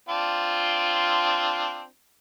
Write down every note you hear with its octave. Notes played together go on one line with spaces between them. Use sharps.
C4 D4 F4